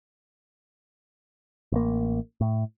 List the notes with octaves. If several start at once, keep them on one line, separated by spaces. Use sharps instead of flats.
A1 A#3
A2